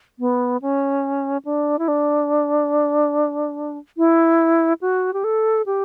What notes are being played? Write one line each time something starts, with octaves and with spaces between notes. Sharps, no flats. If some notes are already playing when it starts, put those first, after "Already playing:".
B3
C#4
D4
E4
D4
E4
F#4
G4
A4
G4